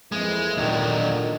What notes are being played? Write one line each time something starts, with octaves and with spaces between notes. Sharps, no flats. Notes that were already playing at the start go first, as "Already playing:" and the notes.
F2 E3 G#3 A#3
D#2 A#2 D3 D#3 F#3